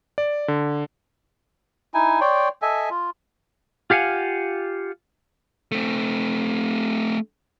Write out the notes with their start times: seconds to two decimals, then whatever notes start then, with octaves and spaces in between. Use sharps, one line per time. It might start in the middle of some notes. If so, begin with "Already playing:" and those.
0.18 D5
0.48 D3
1.94 D#4 E4 G#5
2.21 C#5 D5 G5 C6
2.62 A4 D#5 E5 G#5
2.90 F4
3.90 F4 G4 F5 F#5 G#5
5.72 A3 C4